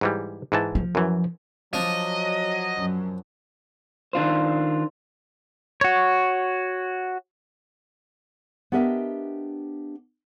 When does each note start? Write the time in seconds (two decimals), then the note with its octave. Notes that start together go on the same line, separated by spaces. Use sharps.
0.01 G#2 E3 G3
0.52 G#2 E3 A5
0.75 F3
0.95 F#2 E3
1.73 F3 F#3 D4 D#5
2.75 F#2
4.13 D#3 D4 F4 C5
5.81 F#4 C#5
8.72 B3 D4 G4 A#4 D#5 E5